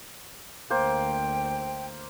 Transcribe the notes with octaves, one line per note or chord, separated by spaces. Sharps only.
D2 A#3 C5 G5